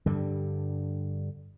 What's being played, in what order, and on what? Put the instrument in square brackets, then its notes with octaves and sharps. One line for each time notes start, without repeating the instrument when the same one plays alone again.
[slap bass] G2 D3 G3